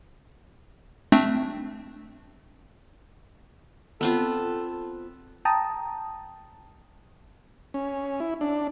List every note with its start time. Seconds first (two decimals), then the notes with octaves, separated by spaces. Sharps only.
1.12 A3 C4 D4
4.01 B3 C4 F4 A4
5.45 G5 A5 A#5 D#6
7.74 C#4
8.20 E4
8.41 D4